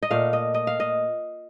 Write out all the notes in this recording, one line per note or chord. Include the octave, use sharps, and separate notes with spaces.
D#5
A#2 A3 F5
D#5
D#5
F5
D#5